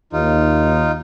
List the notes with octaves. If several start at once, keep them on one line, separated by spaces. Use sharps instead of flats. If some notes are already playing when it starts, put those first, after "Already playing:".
D#2 D#4 F4